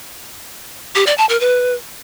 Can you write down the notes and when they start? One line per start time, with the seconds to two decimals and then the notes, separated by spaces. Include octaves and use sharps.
0.95 G4
1.07 D5
1.18 A5
1.29 A#4
1.40 B4